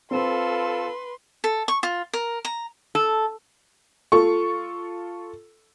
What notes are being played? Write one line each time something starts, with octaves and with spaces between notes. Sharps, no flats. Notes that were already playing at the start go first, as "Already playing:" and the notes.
C4 F4 A4 B4 C6
A4
C#6
F4
A#4
A#5
A4
F4 A4 C#6